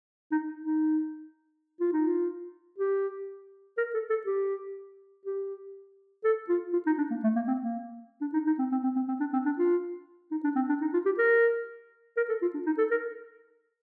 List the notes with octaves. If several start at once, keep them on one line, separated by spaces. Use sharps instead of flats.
D#4
D#4
F4
D#4
F4
G4
A#4
A4
A4
G4
G4
A4
F4
F4
D#4
D4
A#3
A3
A#3
C4
A#3
D4
D#4
D#4
C4
C4
C4
C4
C4
D4
C4
D4
F4
D#4
D4
C4
D4
D#4
F4
G4
A#4
A#4
A4
F4
D4
D#4
A4
A#4